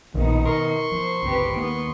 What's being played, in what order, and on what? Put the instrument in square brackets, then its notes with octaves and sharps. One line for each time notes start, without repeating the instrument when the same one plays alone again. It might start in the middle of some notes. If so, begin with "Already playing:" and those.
[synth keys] A#1 [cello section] B2 D#4 [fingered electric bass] D#3
[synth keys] A#4 [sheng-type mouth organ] C6 C#6
[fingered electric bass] F3 [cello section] C5
[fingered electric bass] G1 C#2 [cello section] C4 G4 B4
[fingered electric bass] D#2 [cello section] B3